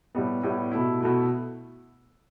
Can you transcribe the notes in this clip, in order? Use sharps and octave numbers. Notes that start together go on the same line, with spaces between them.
A2 G3 B3
A2 G3 B3
B2 A3 E4
B2 A3 E4